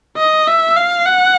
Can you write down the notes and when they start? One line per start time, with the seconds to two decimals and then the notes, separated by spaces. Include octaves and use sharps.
0.17 D#5
0.47 E5
0.76 F5
1.06 F#5